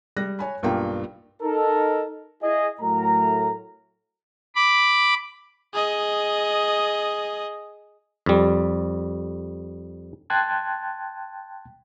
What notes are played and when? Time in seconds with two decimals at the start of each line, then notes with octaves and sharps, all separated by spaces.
0.16 G3 F#6 A#6
0.39 C#5 G#5 B5
0.63 B1 G2 A#3 F4 G5
1.43 D#4 A4 A#4
2.43 E4 G#4 D#5
2.81 A2 F#3 A3 A#4 A#5
4.55 B5 D6
5.74 G#4 D#5
8.26 F2 G3
10.30 G5 A5 C6 F#6 G#6 A6